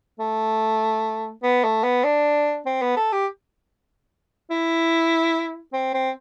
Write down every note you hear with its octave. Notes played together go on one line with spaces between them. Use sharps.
A3
B3
A3
B3
D4
C4
B3
A4
G4
E4
C4
C4